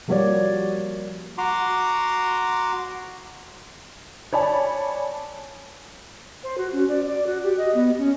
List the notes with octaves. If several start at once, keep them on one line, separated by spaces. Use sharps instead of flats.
F3 G3 A#3 F#4 C#5 D5
F#4 A#5 C6 D6
C#5 D5 G#5 A5 B5
C5
F#4
C#4
D5
D5
F#4
G4
D#5
B3
C#4